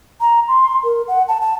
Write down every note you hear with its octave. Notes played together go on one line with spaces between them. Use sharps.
A#5
C6
A#4
F#5
A5
A5